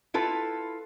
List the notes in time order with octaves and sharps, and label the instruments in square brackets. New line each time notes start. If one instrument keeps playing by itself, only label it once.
[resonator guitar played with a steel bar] E4 F4 A4 B4